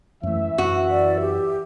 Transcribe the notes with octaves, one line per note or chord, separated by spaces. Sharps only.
F#2 E3 A3 E5
F#2 F#4
D5
G4